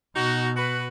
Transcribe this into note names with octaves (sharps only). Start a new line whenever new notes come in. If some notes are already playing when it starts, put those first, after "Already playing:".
B2 D#4 F#4
F#4 B4